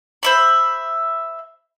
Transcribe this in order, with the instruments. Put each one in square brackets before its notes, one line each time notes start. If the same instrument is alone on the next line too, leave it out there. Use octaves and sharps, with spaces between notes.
[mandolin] C5 E5 B5